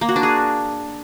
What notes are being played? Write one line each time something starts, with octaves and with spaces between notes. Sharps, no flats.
A#3
F#4
D4
G#4